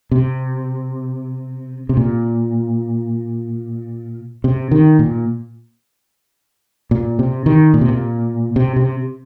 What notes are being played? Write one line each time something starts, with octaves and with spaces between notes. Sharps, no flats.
C3
C3
A#2
C3
D#3
A#2
A#2
C3
D#3
A#2
C3
A#2
C3
C3